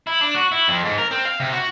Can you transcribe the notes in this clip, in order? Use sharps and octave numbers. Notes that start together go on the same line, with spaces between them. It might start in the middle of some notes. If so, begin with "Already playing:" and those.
E4
D4
F#4
E4
F2
G#2
A#4
C4
F5
C3
F#4